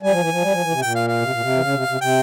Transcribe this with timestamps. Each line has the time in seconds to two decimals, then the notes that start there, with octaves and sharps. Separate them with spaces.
0.02 G3 G#5
0.12 F3
0.21 E3
0.31 F3
0.42 G3
0.52 F3
0.63 E3
0.71 C3
0.82 A#2 G5
0.95 F5
1.08 F5
1.21 C3
1.32 A#2
1.41 C3
1.56 E3
1.61 C#3
1.74 C3
1.88 C3
2.01 C3 G5